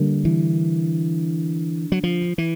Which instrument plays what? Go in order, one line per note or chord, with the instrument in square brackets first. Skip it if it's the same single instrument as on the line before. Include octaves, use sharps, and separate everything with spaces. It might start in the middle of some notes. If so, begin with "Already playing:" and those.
Already playing: [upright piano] D3 G3 A#3
[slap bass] E3
F#3
F3
E3